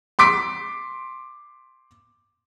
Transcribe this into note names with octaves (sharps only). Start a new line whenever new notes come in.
C6 D6 B6 D7